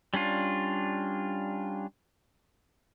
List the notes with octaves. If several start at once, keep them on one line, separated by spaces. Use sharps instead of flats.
G3 C#4 D4 F4